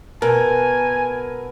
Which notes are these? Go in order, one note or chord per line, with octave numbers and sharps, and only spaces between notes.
B2 A4 A#4 G#5